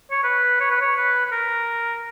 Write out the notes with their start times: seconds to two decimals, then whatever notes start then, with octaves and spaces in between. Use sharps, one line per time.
0.11 C#5
0.24 B4
0.60 C#5
0.71 B4
0.82 C#5
0.96 B4
1.25 B4
1.32 A#4